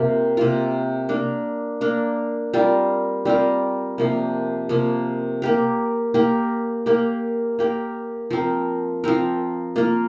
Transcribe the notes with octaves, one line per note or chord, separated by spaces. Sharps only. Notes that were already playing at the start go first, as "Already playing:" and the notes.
Already playing: C3 A#3 F4 A#4
C3 A#3 F4 A#4
A#3 D4 A#4
A#3 D4 A#4
G3 C4 F4 A#4
G3 C4 F4 A#4
C3 F3 A#3
C3 F3 A#3
A#3 G4 A#4
A#3 G4 A#4
A#3 G4 A#4
A#3 G4 A#4
F3 C4 A#4
F3 C4 A#4
A#3 F4 A#4